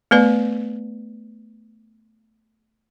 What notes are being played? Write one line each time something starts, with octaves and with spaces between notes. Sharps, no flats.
A3 B3 B4 D5